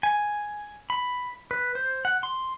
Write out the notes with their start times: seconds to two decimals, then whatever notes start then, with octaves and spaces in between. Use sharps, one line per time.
0.03 G#5
0.90 B5
1.51 B4
1.75 C5
2.05 F#5
2.23 C6